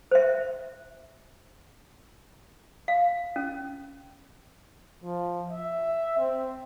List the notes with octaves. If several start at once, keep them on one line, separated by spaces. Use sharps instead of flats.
C5 E5
F5
C#4
F3
E5
C4